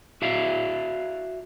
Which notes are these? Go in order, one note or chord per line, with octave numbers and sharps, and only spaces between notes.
F#4 D5 E5 F5